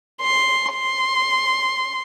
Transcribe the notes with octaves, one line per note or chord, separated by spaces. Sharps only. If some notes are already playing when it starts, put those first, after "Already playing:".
C6
C6